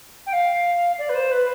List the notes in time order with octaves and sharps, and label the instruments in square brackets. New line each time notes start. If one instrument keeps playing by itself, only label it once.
[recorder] G5
F5
D5
B4
C5
B4